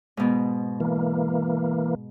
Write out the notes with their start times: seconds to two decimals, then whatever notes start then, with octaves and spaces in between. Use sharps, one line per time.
0.17 G#2 B2
0.80 E3 A#3